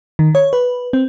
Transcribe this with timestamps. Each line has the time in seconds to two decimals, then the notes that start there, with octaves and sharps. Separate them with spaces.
0.19 D#3
0.35 C#5
0.53 B4
0.93 C4